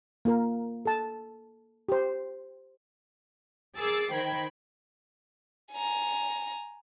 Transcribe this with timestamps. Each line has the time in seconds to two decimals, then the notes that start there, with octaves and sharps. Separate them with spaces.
0.25 A#3 F4 A#4
0.86 A4 A5
1.89 G4 C5
3.77 G#4 A#4 D6 E6 A6 C7
4.13 D#3 C5 G5 B5 G#6
5.72 G#5 A#5